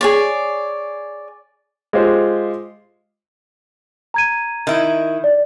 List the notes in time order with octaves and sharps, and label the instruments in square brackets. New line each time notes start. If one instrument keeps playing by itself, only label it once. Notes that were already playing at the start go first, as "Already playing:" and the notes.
[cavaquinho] G#4 C#5 D5
[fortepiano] G#3 F4 G4 C5
[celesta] A#5 G#6 D#7
[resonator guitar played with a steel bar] D#3 E4
[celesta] D5